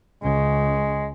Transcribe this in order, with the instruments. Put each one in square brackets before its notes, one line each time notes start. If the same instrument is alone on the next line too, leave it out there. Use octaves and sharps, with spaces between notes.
[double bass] C#2 C#3 [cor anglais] G#3